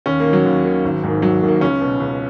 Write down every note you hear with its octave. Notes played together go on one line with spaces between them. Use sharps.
D#2 C#4
A#3
D#3
F#3
D#2
D#3
G#1
G#2 D#3
G#1 F#3
G#2 D#3
A#3
C#2 C#4
B2
C#2